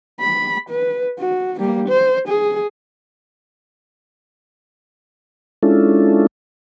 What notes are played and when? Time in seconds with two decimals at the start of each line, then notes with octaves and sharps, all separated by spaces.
0.20 B5
0.70 B4
1.19 F#4
1.59 G3 A#3
1.88 C5
2.28 G#4
5.63 G#3 C#4 D4 E4 F4 A4